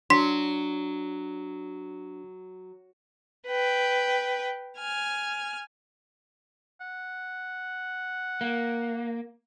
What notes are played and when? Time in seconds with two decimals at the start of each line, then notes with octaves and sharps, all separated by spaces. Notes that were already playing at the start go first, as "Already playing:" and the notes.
0.10 F#3 D4 C6 B6
3.47 B4 G5
4.78 G#5 F6
6.81 F#5
8.41 A#3